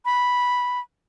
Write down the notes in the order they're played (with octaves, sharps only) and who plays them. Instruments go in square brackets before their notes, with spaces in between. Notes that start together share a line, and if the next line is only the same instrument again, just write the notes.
[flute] B5